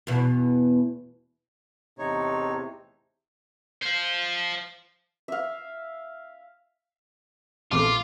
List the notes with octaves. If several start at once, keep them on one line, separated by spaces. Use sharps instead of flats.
E2 B2
E2 A2 C3 D#4 C#5
C5 F5
E5 F5
A#1 E3 A3 F4 D6